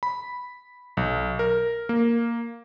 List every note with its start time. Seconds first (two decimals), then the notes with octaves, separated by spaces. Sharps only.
0.03 B5
0.97 B1
1.39 A#4
1.89 A#3